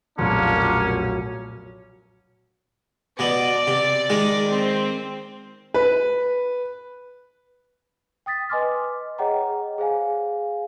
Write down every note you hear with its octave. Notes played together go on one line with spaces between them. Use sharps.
F1 B1 A#2 F#3 A#3 C#4 D4 C6
B2 B3 D5
C3
D#3 G#3
C4
B4
G5 D#6 A6 B6
B4 D#5 G#5 C6 D6 F6
G#4 C#5 D#5 F#5 G5 A#5
G#4 C5 F5 G#5